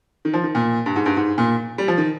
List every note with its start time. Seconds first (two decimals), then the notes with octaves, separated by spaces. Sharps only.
0.25 D#3
0.33 F3
0.43 D#3
0.55 A#2
0.86 G2
0.96 G#2
1.06 G2
1.17 G#2
1.38 A#2
1.78 G3
1.88 F3
1.98 D#3